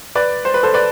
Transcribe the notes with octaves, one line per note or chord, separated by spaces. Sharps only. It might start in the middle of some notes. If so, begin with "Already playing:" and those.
B4 D5
C5
B4
A4 C5
B4 D5